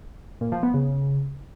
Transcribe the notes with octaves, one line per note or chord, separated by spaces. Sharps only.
A#2
F3
B3
C#3